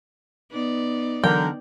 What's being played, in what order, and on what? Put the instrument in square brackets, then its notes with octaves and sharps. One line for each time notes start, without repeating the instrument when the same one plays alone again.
[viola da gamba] B3 D#4 D5
[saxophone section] D3 A#4 [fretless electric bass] E3 F#3 [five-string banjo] G5